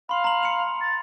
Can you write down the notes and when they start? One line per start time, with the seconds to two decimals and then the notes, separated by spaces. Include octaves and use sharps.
0.09 F5 B5 C6
0.24 A#5 F#7
0.43 C#7 F7
0.81 A6